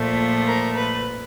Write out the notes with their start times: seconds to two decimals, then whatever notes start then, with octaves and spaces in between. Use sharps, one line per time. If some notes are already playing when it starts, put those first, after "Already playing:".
Already playing: A#2 F3 A3
0.47 A#4
0.77 B4